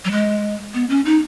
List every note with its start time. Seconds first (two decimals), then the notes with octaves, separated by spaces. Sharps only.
0.05 F#3
0.11 G#3
0.74 B3
0.89 C#4
1.05 D#4